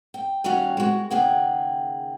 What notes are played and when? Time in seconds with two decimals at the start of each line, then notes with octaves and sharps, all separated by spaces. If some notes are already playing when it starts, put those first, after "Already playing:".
0.14 G5
0.44 D#2 G3 C#4 F#4 F5
0.77 G#3 F#4
1.10 D#2 C#3 G#4 F#5 G5